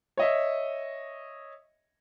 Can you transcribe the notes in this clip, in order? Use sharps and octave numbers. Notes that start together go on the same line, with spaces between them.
C#5 D#5 E5